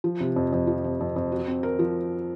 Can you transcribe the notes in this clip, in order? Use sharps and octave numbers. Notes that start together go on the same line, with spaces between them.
F3
C3
F2
F2
F3
C3
F2
F2
F#4
C4
A#4
F3